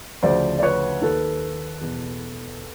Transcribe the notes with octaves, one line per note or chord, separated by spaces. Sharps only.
D2 C#3 F3 C5 D5
D5
B4 C#5
D#2 D#3 A4 B4
E2 B2